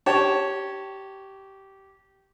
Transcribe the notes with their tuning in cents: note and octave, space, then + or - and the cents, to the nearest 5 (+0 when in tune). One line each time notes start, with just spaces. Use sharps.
G4 -15 C#5 +0 A5 +0